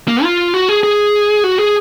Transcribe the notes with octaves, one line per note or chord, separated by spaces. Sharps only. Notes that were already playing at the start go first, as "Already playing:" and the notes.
A#3
F4
F#4
G#4
G#4
F#4
G#4